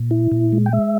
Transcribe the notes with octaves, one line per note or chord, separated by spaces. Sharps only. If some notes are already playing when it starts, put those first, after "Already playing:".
Already playing: A#2
E4
A#2
G#3
G5
G#3 E5